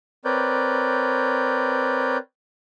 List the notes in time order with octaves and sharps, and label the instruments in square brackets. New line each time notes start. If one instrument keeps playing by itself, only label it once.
[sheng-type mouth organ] C4 A#4 B4 C#5 D5 G6